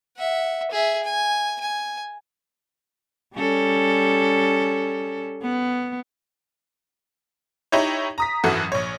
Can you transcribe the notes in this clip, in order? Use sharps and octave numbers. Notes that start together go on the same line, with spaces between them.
E5 F#5
G#4 E5
G#5
G#5
G3 C#4 A4
B3
D#4 E4 G4 C#5
A#5 D#6 B6
G#1 F#2 E3 F#3 F#4 A4
A#1 C#5